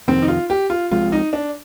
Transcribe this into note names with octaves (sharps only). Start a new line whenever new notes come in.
F2 C3 D#3 C4
D#4
F4
G4
F4
C2 C3 F3 G#3 F4
D#4
D4